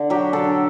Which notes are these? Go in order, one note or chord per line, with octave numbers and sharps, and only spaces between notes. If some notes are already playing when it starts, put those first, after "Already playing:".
Already playing: D3
F#3 G4
D3 A4